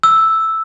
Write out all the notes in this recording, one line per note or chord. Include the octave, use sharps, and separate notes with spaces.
E6